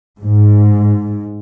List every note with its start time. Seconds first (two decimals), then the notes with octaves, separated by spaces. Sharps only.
0.22 G#2